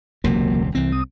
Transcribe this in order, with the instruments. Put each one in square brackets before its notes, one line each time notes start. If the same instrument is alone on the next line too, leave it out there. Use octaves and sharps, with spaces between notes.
[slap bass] E1 C#2 C3 [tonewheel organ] F#3 A#3
[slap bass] C2 C4 [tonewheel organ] E3
[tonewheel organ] D#6